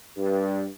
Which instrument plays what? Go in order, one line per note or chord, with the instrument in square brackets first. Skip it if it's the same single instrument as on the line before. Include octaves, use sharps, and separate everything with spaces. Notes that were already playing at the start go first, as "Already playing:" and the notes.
[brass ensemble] G2